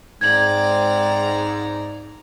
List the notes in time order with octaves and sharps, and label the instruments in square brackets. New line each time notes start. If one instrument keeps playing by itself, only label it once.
[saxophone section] G#2 [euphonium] C4 [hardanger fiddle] D5 A#5 [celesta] G#6 F#7